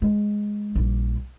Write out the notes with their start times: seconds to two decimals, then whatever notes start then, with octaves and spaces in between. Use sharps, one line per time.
0.02 G#3
0.75 A#1 G3